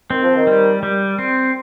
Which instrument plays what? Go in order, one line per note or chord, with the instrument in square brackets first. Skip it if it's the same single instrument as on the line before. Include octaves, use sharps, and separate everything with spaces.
[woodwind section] D#3 [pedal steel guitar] C4
[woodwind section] F3
D#3
[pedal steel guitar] G3
G3
C4